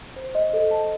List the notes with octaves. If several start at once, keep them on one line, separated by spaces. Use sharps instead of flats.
C5
D#5
A4
A5